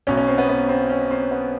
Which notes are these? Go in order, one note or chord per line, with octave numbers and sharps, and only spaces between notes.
B1 B2 C#4
C#4
C4
B3
B3
C4
C#4
C4
B3